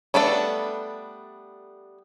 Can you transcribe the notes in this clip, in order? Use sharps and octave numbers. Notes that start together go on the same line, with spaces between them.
G3 A3 B3 D4 A4